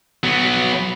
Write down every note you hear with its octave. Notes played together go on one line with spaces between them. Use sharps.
F#3 B3